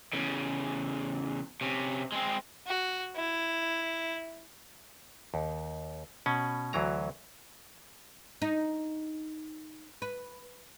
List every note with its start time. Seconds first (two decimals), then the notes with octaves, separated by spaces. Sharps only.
0.13 E2 C#3
1.61 C3 C#4
2.12 G#3 C4
2.67 F#4
3.16 E4
5.34 D#2
6.26 B2 C#4
6.73 D2 E3 F#3 A#5
8.42 D#4
10.02 B4